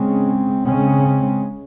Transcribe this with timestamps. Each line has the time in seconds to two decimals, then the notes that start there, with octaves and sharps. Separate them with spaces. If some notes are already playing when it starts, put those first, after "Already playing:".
Already playing: C#3 G#3 C4 C#4
0.66 C#3 G#3 C4 C#4